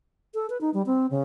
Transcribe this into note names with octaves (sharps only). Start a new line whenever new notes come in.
A4
B4
D#4
G3
C4
C#3